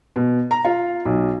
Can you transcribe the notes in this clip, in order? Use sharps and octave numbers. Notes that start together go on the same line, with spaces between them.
B2
A#5
F4
B1